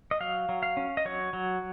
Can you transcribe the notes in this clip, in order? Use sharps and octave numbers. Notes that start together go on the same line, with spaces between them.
D#5
F#3 F5
F#3
F5
C#4
D#5
F#3 C#5
F#3